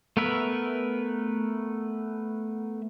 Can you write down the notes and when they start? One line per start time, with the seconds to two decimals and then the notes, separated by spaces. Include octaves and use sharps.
0.17 A3 B3 A#4 B4 E5